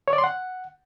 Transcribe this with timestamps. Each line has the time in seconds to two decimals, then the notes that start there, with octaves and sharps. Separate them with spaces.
0.08 C#5
0.13 D5
0.18 C6
0.24 F#5